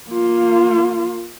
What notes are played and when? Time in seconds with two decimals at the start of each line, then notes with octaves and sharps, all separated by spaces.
0.10 A#3 F4